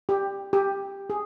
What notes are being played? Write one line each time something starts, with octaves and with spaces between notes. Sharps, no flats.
G4
G4
G#4